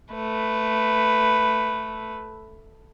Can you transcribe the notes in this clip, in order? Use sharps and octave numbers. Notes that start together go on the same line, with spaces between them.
A3 B4